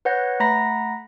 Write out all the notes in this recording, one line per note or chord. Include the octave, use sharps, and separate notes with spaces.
B4 C#5 F#5 G6 A#6
A3 F#5 A#5 B5 A#6 B6